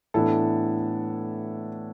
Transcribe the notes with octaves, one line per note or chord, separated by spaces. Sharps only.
A2 E3 B3 D4 E4 A4